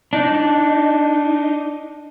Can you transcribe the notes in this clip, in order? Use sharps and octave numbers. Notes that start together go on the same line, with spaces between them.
D4 D#4